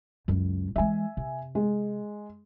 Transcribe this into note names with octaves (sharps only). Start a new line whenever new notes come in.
C#2 F#2
E3 G#3 E5 G#5
C3
G#3